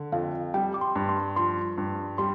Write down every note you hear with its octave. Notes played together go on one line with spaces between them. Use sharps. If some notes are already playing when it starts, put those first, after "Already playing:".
Already playing: D3
F2 F5
G3 G5
D6
C6
G2
C6
F3 C6
G2
G3 C6